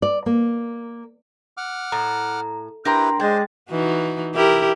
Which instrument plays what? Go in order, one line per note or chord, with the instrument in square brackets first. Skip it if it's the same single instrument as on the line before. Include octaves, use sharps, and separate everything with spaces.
[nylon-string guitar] D5
A#3
[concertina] F#5 D6 F6
[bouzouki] A2 [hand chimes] A#5
[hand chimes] D4 C6 [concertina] E4 G4 B4 [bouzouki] A#4 G5 A#5
[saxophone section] G#3 [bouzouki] D4 [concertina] C5 [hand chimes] G5 G#6 A6
[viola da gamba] E3 D#4 F#4
E4 G4 A#4